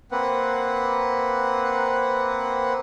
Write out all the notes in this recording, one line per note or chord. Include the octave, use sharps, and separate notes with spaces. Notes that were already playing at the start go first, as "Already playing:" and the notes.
A#3 C4 B4 F#5